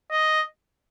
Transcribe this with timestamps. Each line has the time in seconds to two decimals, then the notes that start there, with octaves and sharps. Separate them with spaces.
0.11 D#5